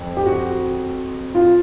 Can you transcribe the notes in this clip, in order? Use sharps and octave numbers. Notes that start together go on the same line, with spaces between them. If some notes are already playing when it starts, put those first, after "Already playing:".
Already playing: F2
G4
F#4
F4